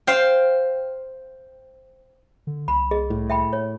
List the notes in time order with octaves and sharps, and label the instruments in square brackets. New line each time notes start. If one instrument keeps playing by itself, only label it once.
[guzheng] C5 F5 G5
[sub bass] D3
[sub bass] C2 [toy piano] B5
[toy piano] G#4 D#5
[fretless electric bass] A2
[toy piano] E5 G5 B5
C#5